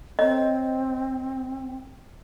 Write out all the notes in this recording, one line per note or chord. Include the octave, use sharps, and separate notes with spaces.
C4 C#5 D#5